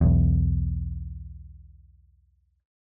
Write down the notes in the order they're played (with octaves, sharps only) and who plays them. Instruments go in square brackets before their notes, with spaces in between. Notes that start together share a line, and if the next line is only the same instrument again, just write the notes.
[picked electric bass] B1 E2